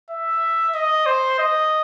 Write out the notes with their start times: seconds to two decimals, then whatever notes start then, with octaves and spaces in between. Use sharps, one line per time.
0.10 E5
0.74 D#5
1.06 C5
1.39 D#5